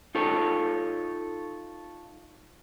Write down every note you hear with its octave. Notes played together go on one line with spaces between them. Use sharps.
D#4 F4 A4 C#5